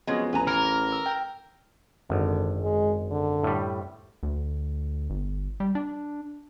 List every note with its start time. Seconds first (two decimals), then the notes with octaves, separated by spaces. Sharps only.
0.07 F2 F#3 G#3 B3 C#4 G#4
0.33 A1 F2 B4 G#5 A#5
0.47 E3 A#4 F6
0.65 A#6
0.92 E6
1.06 G5
2.10 G#1 F#2 D3
2.62 G#3
3.11 D3
3.44 A2 G3
4.23 D2
5.10 G1
5.60 G3
5.75 D4